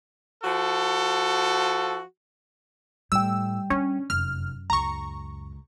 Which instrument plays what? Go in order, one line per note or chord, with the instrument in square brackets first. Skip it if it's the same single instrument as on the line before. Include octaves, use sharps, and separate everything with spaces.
[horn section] F3 F#4 A4
[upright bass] A2 [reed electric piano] G3 G5 [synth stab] E6
[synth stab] C#4 [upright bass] D4
[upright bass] F1 [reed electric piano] F#2 [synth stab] F6
[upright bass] C#2 [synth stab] A#5 C#6